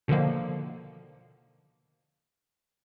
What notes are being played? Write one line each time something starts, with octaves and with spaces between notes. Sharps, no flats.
B2 D3 D#3 F3 A#3